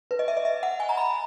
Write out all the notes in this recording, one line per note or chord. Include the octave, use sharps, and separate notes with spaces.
B4
D#5
E5
D#5
E5
F#5
G#5
A#5
B5